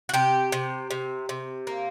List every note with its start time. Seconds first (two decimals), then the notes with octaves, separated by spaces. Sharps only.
0.09 F#4
0.14 C3 G4
0.52 C3
0.90 C3
1.29 C3
1.67 A#3